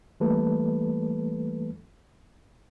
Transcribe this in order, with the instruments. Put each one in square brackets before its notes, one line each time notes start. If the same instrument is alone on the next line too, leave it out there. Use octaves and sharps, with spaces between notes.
[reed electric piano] E3 G3 A3 A#3 A4 B4